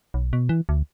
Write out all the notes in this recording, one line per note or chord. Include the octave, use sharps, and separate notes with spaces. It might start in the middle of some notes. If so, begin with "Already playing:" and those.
B1
B2
E3
D2